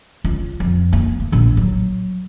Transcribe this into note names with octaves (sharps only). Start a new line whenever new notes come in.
C#2
F2
A#3
A3
A#1 A2
F#3